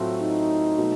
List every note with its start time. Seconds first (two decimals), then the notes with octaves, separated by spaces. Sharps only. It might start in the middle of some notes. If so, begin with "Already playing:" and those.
Already playing: A2 F#3 A3 C4 F4
0.22 D#4
0.77 B2 F#3 A3